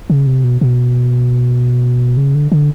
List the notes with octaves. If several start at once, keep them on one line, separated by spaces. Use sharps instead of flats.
C#3
C3
B2
B2
C#3
D3
D3